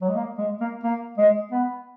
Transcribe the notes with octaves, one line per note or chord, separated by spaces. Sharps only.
F#3
G#3
A#3
G#3
A#3
A#3
G#3
B3